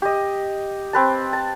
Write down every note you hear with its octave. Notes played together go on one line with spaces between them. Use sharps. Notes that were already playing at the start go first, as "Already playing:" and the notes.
G4 D#5
C4 B4 A5
A5